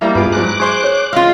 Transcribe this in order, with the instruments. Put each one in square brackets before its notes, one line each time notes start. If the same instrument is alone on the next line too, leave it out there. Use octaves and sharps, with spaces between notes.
[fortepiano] G3 A#3 E4 [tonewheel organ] A#5
[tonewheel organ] G2 B3 D6 [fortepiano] F4 G#4 B4
[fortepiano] G#2 F#3 [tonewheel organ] D6 F#6
[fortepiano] G#4 C5 [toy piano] C#6
[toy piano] C#5
[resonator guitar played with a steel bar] G#3 F4 [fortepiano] F5